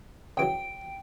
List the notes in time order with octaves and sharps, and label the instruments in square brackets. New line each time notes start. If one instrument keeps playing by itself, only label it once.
[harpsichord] C#3 E3 F#3 [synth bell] G5 D7